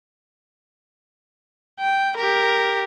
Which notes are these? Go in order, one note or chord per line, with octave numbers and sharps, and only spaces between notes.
G5
G4 A#4